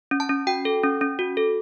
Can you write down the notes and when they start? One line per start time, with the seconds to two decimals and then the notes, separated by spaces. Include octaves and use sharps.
0.11 C#4
0.20 A5
0.29 C#4
0.47 F#4 G5
0.65 A4
0.83 C#4
1.01 C#4
1.19 F#4
1.37 A4